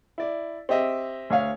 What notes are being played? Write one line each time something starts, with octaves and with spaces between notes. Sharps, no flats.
E4 D5
C4 G4 D#5 E5
D2 C#5 F5